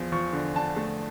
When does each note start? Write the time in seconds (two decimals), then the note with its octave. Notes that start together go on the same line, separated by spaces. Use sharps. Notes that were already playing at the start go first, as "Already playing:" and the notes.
Already playing: E2 F3
0.12 F3 C#6
0.33 D3
0.55 D3 A5
0.76 A3